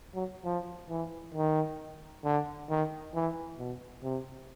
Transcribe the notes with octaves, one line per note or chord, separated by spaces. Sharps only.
F#3
F3
E3
D#3
D3
D#3
E3
B2
C3